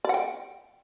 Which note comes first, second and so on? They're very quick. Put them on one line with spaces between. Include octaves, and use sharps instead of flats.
D5 F#5 G5